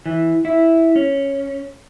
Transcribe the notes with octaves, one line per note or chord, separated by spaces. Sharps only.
E3
E4
C#4